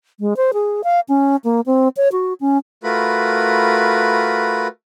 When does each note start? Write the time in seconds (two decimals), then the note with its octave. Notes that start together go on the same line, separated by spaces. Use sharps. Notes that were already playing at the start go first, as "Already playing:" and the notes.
0.20 G#3
0.37 C5
0.53 G#4
0.84 F5
1.08 C#4
1.44 A#3
1.66 C4
1.97 C#5
2.12 F#4
2.41 C#4
2.84 A3 F4 F#4 A#4 B4 B5